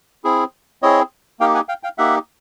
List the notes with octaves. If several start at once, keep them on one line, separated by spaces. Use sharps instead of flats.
C4 E4 G#4
C4 E4 G#4 C#5 D#5
A#3 D#4 G4 F5 G5
F#5 G#5
F5 G5
F5 G5
A#3 D#4 G4 E5 F#5